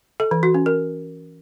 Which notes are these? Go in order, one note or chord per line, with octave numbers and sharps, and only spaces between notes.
A4
E3
F#4
C#4
A#4